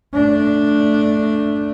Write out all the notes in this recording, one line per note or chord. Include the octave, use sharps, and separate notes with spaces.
A3 D4